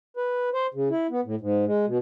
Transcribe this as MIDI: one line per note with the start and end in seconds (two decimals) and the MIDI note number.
0.17 0.49 71
0.54 0.66 72
0.74 0.89 49
0.90 1.07 64
1.11 1.20 59
1.25 1.35 45
1.41 1.65 44
1.66 1.86 56
1.87 1.98 47